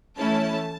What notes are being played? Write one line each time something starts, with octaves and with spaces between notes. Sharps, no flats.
E3 A3 C#4 E4 A5